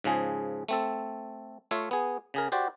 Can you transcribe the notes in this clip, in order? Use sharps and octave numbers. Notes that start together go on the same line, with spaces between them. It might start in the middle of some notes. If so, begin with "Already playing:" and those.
G#2 C#3 F3 G#4
A3 C4 A4
A3 F4 C#5 E5 F5
B3 G#4
C#3 G#4 A#4
F#4 G4 C5 D5